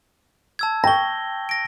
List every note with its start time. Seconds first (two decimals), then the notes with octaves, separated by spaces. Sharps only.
0.59 A5 E6 G#6
0.84 G5 C#6 A#6 G7
1.49 A#6 D7